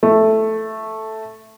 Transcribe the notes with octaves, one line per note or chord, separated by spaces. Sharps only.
A3